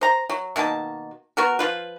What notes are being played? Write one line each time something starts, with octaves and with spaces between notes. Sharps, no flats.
C5 A#5
F#3
B2 D#3 A#3 A5
B3 F#4 A#4
F3 F4 B4